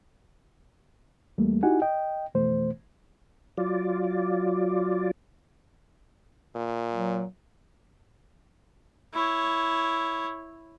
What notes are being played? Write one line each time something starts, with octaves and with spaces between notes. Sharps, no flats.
E2 G3 A3 A#3
D#4 E4 F#4 G4 F#5 G#5
D#5 G5
F2 B2 E3 A3 C5
F#3 F4 D5
A#2
F#3
E4 C#5